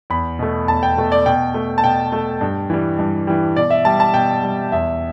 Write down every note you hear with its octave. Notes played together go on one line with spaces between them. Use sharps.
E2 B5
B2 A3
E2 A5
G5
B2 A3
D5
B2 G5
A3
A5
B2 G5
A3
G2
E3 G3
G2
E3 G3
B2 D5
E5
G3 A5
A5
B2 G5
G3
E2 E5